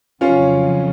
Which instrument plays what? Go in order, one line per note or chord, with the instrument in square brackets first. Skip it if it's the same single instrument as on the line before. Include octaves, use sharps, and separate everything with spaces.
[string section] F2 C#3 F#3 [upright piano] C#4 F4